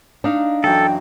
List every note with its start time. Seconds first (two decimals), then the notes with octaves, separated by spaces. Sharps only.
0.24 D4 D#4 F5 F6
0.64 F#2 E3 A4 G5